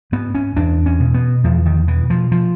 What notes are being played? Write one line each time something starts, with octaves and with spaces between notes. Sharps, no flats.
G#2 B3
C#4
E2 D4
C#4
B2
B3
E2 F3
D#3
B2 E3
F3
F3